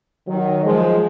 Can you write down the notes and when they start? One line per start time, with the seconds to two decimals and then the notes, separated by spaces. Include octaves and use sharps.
0.28 D#3 F#3
0.65 F3 G#3